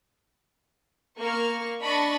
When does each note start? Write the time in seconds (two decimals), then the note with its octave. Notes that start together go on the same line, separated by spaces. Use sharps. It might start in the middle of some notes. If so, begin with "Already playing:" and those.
1.19 A#3 C#6 F6
1.81 D4 D#5 B5 C#6 A6